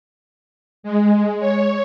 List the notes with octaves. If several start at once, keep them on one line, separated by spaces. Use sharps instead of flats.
G#3
C#5